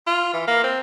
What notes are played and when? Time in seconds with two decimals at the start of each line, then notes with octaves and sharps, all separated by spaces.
0.07 F4
0.34 E3
0.48 A#3
0.64 C4